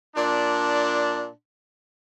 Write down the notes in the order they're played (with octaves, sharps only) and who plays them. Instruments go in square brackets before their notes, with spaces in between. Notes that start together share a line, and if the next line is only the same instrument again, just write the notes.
[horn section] A#2 D4